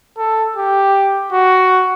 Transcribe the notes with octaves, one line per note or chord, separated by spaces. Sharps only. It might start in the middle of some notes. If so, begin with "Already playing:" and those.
A4
G4
F#4